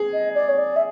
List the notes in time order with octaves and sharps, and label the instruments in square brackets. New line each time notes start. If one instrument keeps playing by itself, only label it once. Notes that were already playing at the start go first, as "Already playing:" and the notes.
Already playing: [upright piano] G#4
[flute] D#5
D5
C#5
D5
E5